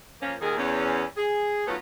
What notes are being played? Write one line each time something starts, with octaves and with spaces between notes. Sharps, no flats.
F3 A#3 C#4
D#2 A#2 D#3 G#4
E2 C#4
G#4
F#3 A3 B3 C#4 D#4 F4